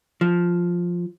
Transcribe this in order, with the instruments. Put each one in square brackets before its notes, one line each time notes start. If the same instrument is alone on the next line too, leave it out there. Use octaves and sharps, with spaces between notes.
[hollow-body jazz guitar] F3